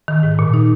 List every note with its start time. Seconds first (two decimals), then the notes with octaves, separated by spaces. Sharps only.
0.08 D#3
0.23 G#2
0.39 A#2
0.54 D#4